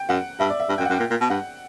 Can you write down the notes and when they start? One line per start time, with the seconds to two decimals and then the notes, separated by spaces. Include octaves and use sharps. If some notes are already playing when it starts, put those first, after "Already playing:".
Already playing: G5
0.09 F#2 F#5
0.39 G2 E5
0.50 D5
0.60 E5
0.69 G2
0.78 F#2 G5
0.85 F#5
0.90 F#2
0.94 G5
1.00 A#2
1.10 A#2
1.21 B2
1.30 G2 F#5